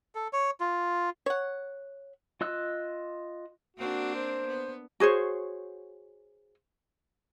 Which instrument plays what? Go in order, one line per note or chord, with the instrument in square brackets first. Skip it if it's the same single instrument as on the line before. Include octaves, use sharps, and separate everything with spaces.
[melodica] A4
C#5
F4
[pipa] C#5 F#5
[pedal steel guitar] F4 D#5 E6 F#6
[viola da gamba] A#3 C4 D4 [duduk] F#4
[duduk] C5
[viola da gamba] B3
[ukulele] F#4 G#4 C5 C#5